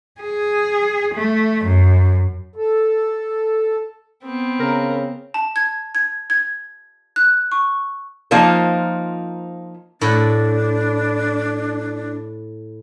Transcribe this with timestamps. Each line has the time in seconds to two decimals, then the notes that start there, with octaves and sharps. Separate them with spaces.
0.21 G#4
1.14 A3
1.65 F#2
2.56 A4
4.23 B3 C4
4.59 C#3 A#4
5.34 A5
5.56 G#6
5.95 G#6
6.30 G#6
7.16 F#6
7.52 C#6
8.31 F3 A#3 D#4 F4 A#4 C5
10.01 A2 D4 F#5